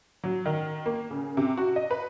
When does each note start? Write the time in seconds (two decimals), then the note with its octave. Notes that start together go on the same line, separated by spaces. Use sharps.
0.24 F#3
0.46 D#3
0.86 A#3
1.11 C#3
1.37 C3
1.57 F#4
1.76 D#5
1.91 B4